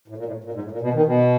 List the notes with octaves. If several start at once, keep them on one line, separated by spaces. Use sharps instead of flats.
A2
A#2
A2
A#2
G#2
A2
A#2
B2
D#3
B2